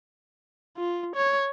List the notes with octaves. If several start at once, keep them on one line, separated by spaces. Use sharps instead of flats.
F4
C#5